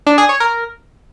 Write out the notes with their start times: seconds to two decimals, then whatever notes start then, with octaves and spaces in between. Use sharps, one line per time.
0.07 D4
0.18 G#4
0.29 C#5
0.40 A#4